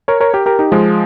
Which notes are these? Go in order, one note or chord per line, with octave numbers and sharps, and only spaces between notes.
A#4 C#5
A#4 C#5
G4 A#4
G4 A#4
D#4 G4
F3 G#3